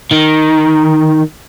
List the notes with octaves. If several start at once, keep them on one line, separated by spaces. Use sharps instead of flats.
D#3